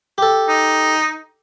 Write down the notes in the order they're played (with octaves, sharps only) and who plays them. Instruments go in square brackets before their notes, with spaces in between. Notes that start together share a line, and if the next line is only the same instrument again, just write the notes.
[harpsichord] G4 A4
[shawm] D#4